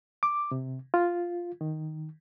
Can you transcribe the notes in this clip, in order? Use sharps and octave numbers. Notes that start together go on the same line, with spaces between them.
D6
C3
F4
D#3